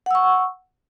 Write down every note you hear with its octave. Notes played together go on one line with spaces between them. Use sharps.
F#5 C#6 E6